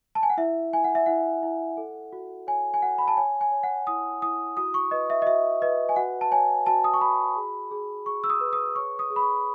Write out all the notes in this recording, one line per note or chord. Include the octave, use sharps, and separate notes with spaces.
A5
G#5
F#5
E4 E5
E4 G#5
F#5
E5
E4 F#5
E4
A4
F#4
C#5 G#5
G#5
F#4 F#5
B5
A5
C#5 G#5
G#5
C#5
F#5
E4 D#6
E4 D#6
F#4 D#6
C#6
B4 D#5
E5
D#5
F#4 E5
B4 D#5
G#5
F#4 F#5
A5
C#5 G#5
F#4 A5
D#6
C#6
F#4 B5
G#4
G#4
G#4 C#6
E6
D#6
B4
D#6
C#5 C#6
D#6
G#4
B5
C#6